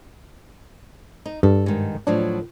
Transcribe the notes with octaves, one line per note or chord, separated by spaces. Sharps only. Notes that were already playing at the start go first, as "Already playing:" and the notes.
D#4
G2 A4
G#2 D#3
A2 F3 F#3 D4